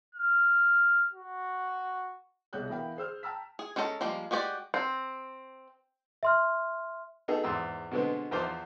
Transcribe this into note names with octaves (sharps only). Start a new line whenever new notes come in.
F6
F#4
C2 B2 G#4 C#5 F#6 G6
E3 B3 A#4 F5 G5 B5
G#4 C5 E6 F6
G5 A5 A#5 E6 F6 B6
G#4
G#3 C#4 D4 A4 A#5
F3 G3 G#3 A#3
G#3 F#4 G4 C5 D5
C4
E5 C6 F6
B3 D#4 F#4 G#4 A4
E2 G#2 C6 E6
B2 D3 G#3 B3 C4
E2 F3 F4 C5 C6 D6